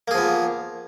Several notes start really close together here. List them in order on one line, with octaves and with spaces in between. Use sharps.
A#3 G#4 F3 B3